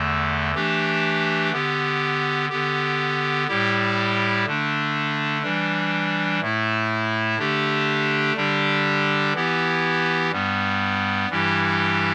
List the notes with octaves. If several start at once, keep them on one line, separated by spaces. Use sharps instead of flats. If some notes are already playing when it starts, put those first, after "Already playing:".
Already playing: E2 D3 A3
E3 A3 D4 G4
D3 B3 G4
D3 B3 G4
A2 G3 E4 G4
D3 A3 D4
E3 G3 D4
A2 A3 E4
D3 A3 D4 G4
D3 G3 D4 G4
E3 B3 E4 G4
G2 G3 B3
G2 E3 G3 E4 G4